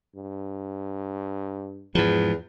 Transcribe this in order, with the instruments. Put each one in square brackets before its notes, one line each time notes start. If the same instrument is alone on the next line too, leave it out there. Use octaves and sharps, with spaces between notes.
[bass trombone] G2
[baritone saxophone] E2 [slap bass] G#2 F3